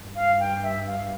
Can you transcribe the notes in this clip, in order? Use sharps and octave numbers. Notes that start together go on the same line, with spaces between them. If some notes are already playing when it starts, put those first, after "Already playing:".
Already playing: G2
F5
G5
E5
F5